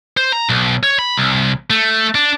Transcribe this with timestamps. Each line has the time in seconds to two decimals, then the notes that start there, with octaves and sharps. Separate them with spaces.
0.17 C5
0.32 A#5
0.49 B1
0.83 C#5
0.99 B5
1.18 C2
1.70 A3
2.15 D4